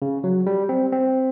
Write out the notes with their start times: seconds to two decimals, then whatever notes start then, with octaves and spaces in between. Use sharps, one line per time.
0.02 C#3
0.24 F#3
0.46 G3
0.69 C4
0.92 C4